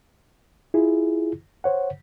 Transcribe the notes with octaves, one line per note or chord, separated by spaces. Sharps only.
E4 F4 G#4
C5 C#5 F#5